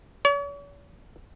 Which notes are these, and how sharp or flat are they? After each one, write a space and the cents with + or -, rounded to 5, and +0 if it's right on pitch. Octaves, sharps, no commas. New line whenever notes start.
C#5 +45